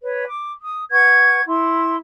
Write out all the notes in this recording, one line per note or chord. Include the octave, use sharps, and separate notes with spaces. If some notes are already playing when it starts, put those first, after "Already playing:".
B4 C#5
D6
D#6
B4 F#5 C#6 G#6
E4 C6